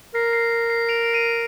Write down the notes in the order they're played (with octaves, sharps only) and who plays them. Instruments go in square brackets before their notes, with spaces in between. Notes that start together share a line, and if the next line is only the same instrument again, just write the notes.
[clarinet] A#4 [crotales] C7
[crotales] C7
C7
C7
D7 F7
D7
C7 D#7